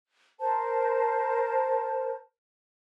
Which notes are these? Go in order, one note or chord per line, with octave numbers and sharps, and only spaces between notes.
A#4 C5 A5